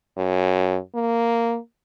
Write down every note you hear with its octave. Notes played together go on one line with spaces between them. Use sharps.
F#2
A#3